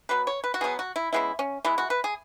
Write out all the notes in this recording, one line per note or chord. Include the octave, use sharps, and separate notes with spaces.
B2 F#3 B3 B4
C#5
B4
F#4
B2 F#3 B3 G#4
F#4
E4
C#3 G#3 B3 E4
C#4
E3 G#3 B3 E4
F#4
B4
G#4